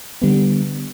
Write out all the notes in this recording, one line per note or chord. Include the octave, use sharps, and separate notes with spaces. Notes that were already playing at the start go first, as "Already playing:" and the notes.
D3 G3 B3